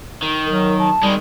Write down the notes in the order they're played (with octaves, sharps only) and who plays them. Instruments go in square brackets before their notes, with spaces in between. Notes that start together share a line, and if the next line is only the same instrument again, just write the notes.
[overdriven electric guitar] D#3
[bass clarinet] F#3 [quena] A#4
[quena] A5
[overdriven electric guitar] D#3 G#3 [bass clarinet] G3